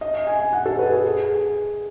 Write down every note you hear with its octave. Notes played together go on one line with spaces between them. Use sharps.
D#5
E5
G#5
G#5
F#5
A4
B4
G#4
A4
G#4